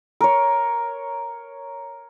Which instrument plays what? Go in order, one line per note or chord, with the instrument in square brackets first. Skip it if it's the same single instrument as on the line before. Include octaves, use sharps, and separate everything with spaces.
[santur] A#4 C#5